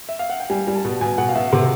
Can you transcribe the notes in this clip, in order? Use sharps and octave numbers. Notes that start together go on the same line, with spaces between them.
E5
F5
F#5
G5
G3 G#5
G3
A5
B2
B2 G#5
B2 F#5
F5
B2 E5
C3 F#5